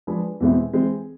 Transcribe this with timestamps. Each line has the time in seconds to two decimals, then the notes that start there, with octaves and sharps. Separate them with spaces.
0.07 F3 G#3 D4 G#4 B4
0.40 E2 B2 G#3 C4 E4
0.73 E3 G#3 C4